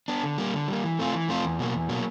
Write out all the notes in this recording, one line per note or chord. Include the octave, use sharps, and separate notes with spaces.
B3 D4
D3
G3 A#3
D3
G3 A#3
E3
A3 C4 F4
E3
A3 C4 F4
E2
B2 F#3 A#3
E2
B2 F#3 A#3